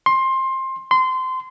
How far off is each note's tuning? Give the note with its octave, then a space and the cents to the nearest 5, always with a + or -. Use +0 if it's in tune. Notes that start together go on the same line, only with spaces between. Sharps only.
C6 +20
C6 -20